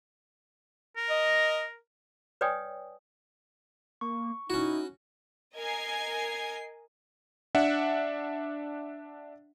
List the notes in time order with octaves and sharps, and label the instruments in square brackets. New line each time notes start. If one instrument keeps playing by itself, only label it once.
[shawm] A#4
[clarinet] D#5
[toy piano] B4 C#5 D5 G5 G#5 D#6
[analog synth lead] A#3 [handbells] C#6
[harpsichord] C#4 F#4 [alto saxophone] D#4 [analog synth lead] E4
[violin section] A#4 D#5 G#5 G#6 C7
[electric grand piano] D4 E5 F#5